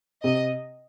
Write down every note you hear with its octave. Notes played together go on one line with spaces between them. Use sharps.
C3 D#5